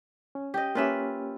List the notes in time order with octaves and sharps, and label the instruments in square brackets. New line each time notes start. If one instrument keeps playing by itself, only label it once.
[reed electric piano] C#4
[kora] G4 D#5
[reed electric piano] A#3 C#4 G4 [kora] F4 B4 E5